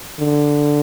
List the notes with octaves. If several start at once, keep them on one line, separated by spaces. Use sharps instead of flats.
D3